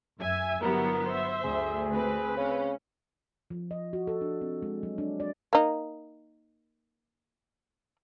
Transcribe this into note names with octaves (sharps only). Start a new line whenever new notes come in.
F#2 E5 G#5
G1 F#3 B3 E4 G4 A#4
C5 E5
D2 G#4
C4 B4
C#3 C#4
F3
D#5
F#4
A4
D4
C4
G#3
F#3
D4
D5
A#3 D#4